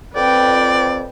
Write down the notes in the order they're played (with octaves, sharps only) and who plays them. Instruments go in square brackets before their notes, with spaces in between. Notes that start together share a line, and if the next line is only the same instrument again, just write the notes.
[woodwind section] F2 C4 [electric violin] B4 G5 [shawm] D5